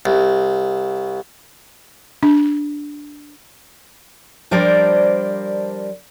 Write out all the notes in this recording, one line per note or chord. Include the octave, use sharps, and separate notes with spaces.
C2
D4
F3 G3 D4 A#4 C5 D5